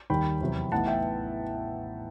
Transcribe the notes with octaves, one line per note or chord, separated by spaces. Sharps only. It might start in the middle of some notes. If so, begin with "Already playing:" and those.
D#2 D#3 G3 G5 B5
E2 C3 F#3
A1 A2 E3 B3 D#4 F#5 A5
E5 G5